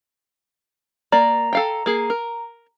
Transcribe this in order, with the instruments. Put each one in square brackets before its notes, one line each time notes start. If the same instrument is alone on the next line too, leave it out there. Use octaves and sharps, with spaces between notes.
[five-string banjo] A#3 D5 [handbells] A#5
[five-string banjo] A4 F5 G5
A#3 G#4
A#4